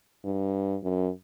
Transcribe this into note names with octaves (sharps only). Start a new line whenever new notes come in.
G2
F#2